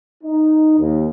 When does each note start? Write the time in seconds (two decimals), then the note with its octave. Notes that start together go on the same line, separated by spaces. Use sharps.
0.24 D#4
0.79 D#2